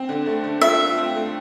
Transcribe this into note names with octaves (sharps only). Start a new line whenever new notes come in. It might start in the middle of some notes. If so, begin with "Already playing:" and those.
Already playing: C4
D3
A3
D3
F4 E5
F4
C4
A3